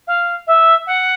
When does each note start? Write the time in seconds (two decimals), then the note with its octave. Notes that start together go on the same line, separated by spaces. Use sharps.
0.07 F5
0.47 E5
0.86 F#5